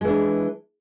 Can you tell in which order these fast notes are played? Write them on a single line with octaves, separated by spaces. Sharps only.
G#3 E3 D4